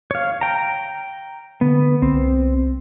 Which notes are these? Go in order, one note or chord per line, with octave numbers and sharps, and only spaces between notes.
C#5 F5
G5 A#5
D3 B3
C2 C4